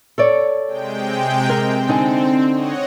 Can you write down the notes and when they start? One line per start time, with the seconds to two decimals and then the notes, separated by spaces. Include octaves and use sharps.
0.18 A4 C#5 D5
0.66 C3 G#3 G5
1.49 C4 A#4
1.89 D3 D#4 G#5
2.51 C#5 D#5 F#5